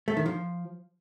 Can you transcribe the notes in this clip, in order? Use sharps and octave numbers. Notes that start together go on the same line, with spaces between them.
A3
D#3
F3